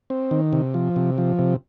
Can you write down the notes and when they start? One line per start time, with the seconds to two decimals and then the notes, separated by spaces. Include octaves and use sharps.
0.10 C4
0.31 D#3
0.53 C3
0.74 F3
0.96 C3
1.18 F3
1.39 C3